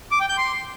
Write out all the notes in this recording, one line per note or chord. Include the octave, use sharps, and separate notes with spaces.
D6
G5
G6
C6